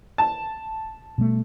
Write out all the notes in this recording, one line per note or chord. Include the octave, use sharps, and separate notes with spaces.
A5
B2 G3 A3